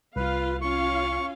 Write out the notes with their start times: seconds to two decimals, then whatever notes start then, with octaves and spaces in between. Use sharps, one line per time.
0.16 C2 F4 B4 F5
0.61 C#4 F4 F5 C#6